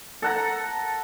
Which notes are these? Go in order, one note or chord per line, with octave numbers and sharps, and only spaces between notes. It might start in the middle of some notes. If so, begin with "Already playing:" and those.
A4 F#5 A#5